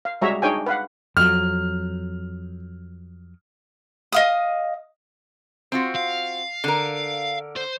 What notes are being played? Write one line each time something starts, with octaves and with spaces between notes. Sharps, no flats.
F5
G3 G#3 F#4 C#5 E5 A#5
D4 D#4 G#4 C#5 G5 G#5
B4 F5 F#5
F2 F#3 F6
D#5 F5 D#6
C4 F4 F#4
F5
D3 A#4
C5